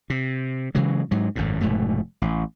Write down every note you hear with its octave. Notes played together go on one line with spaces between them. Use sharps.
C3
C#3 E3 F#3 G#3
G#2 F#3
G#1 F#2 A2
F1 G#2 B2 A3
A1